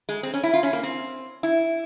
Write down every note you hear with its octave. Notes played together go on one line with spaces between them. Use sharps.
G#3
C4
C#4
E4
F4
C#4
A#3
C4
E4